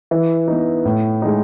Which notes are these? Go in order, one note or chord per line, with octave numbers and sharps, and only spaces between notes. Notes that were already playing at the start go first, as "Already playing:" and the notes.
E3
B3 D#4
A2
G#3 D#4